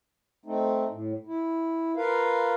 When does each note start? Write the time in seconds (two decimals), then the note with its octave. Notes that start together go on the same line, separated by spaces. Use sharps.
0.46 A3 C4 D#4
0.90 A2
1.27 E4
1.97 F4 A#4 B4 F5